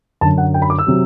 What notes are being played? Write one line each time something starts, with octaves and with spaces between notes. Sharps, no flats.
F#2 D3 F#3 A5
F#5
G5
B5
D6
E6
C3 F#3